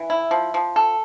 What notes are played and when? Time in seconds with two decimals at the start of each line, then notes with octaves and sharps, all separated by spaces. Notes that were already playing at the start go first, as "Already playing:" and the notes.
Already playing: E3
0.10 E4
0.31 F3
0.54 F3
0.76 A4